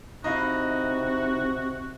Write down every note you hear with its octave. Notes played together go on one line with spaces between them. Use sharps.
C3 D#4 E4 F#4 D#5 F5